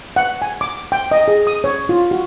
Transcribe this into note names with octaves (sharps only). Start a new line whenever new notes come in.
F#5
G#5
D6
G5
D#5
G#4
D#6
C#5
F4
F#4